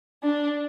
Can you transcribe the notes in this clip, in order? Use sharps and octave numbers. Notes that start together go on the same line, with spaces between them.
D4